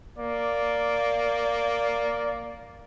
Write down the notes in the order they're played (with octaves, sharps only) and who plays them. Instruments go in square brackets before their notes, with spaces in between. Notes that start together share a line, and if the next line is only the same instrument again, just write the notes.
[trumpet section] A#3 D5